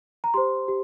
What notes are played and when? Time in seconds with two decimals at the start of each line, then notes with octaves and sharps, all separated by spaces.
0.24 A#5
0.34 G4 C5 C6
0.68 G4